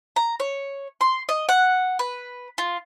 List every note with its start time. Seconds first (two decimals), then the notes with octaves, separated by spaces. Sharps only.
0.16 A#5
0.40 C#5
1.01 C6
1.29 D#5
1.49 F#5
1.99 B4
2.58 F4